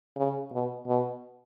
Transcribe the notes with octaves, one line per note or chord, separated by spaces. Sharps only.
C#3
B2
B2